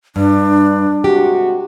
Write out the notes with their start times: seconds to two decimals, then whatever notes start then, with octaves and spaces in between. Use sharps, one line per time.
0.16 G2 D4
1.04 C3 G#3 F#4 G4